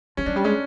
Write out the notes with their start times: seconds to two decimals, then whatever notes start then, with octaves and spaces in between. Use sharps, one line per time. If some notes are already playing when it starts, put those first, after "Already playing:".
0.17 F3 C#4
0.26 F#3 D4
0.36 G3
0.44 G#3 C#4